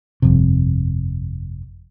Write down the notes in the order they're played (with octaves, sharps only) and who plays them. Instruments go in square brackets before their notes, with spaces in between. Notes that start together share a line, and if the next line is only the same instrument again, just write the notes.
[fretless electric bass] G1 F2 C3